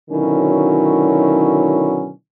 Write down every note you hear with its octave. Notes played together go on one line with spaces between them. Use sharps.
B2 D3 D#3 F#3 C#4 E4